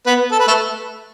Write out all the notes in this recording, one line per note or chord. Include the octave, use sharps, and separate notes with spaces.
B3 B4
A4
B4
A3 A4